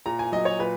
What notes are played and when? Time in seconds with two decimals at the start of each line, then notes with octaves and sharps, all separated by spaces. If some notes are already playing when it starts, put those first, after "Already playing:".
0.06 A#2 A#5
0.19 G#5
0.32 F#3 D#5
0.45 C#5
0.59 A#2 B4